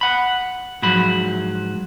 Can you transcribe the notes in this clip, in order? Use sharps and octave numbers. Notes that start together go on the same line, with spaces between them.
F#5 B5
G#2 F3 F#3 B5